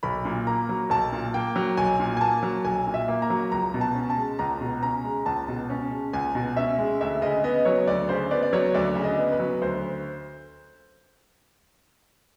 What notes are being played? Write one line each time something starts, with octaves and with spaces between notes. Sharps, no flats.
B1 B5
A#2
A#3 A#5
F#3
B1 A5
A#2
A#3 G5
F#3
B1 G#5
A#2
G#5
A#3 A5
F#3
B1 G#5
A#2
E5
A#3
A#5
F#3
C#2 A#5
B2
A5
C#4
A5
G#3
C#2 A#5
B2
C#4 A#5
G#3
C#2 A5
B2
C#4
G#3
C#2 G#5
B2
C#4 E5
G#3
D2 E5
C#3 D#5
B3 D#5
F#3 C#5
D2 D5
C#3 C5
B3 D5
D5
F#3 C#5
D2 D5
C#3
D#5
B3
B4
F#3
D2 C5